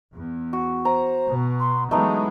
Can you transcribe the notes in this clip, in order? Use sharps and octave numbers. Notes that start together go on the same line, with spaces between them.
E2
F#4
C5 A#5
B2
C6
E3 F#3 G#3 A3 B3 D#4 A#5